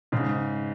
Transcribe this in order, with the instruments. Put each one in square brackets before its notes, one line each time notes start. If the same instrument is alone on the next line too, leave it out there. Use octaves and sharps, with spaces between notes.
[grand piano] G#2 C#3